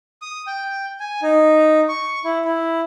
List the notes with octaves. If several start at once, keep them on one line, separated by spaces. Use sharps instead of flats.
D#6
G5
G#5
D#4
C#6
E4
E4